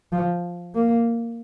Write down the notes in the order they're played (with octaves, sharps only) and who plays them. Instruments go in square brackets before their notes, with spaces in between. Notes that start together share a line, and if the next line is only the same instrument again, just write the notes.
[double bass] F3
A#3